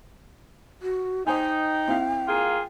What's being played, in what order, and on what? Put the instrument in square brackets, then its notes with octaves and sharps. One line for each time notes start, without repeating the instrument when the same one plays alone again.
[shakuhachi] F#4
[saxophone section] D#4 [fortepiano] C5 G#5 [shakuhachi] G5
[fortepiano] C4 E4 F5
[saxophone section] A#3 F4 G#4